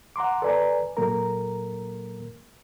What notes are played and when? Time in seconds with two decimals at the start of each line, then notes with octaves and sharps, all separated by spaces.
0.16 F#5 A#5 C6 D6
0.42 A4 B4 D5 G#5 A#5
0.97 A#2 F#3 A#3 A4 A#4 A#5